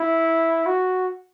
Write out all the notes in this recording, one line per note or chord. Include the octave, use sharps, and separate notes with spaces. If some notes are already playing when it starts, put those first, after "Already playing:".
Already playing: E4
F#4